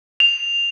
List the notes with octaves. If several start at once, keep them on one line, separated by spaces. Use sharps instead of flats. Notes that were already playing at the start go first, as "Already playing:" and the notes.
F7